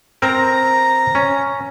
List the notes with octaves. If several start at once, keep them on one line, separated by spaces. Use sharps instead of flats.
C4 A#4 A#5
C#4